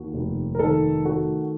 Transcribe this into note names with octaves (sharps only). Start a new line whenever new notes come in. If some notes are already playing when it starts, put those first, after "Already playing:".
Already playing: D#2 F#4
F1
A#4
D#3 A4
A3 F#4